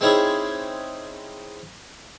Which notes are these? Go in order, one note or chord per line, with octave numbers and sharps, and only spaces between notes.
G#3 C4 C#4 D#4 E4 G#4